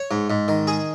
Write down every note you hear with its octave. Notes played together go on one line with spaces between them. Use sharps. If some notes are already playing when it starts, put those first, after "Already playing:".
Already playing: C#5
G#2
G#2
D#3
G#4